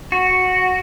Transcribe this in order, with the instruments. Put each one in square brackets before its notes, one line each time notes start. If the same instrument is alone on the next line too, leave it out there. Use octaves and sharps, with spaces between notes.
[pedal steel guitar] F#4